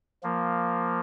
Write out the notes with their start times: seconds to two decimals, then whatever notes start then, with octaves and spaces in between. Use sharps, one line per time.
0.23 F3 A#3